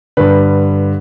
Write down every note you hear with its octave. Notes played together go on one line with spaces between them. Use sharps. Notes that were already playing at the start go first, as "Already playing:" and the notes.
G2 D3 B4